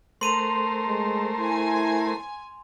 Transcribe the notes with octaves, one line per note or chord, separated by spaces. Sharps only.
A3 A#4 C5 C6 D#7 F7
G#3
E4 G#5